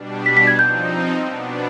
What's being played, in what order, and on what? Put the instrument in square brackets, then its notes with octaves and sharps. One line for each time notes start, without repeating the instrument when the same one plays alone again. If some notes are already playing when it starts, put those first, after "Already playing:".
Already playing: [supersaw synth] B2 G3 D4
[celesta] B6
B6
G#6
[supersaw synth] F3 C4 D#4 [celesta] G6
[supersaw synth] B2 B3 D4